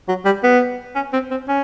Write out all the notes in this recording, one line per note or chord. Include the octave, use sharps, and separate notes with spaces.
F#3
G3
B3
C#4
C4
C4
C#4